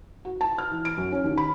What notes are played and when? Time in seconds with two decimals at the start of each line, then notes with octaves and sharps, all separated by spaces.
0.25 F#4
0.41 A5
0.58 F6
0.71 E3
0.85 D7
0.97 F#2
1.12 C#4
1.24 D#2
1.38 B5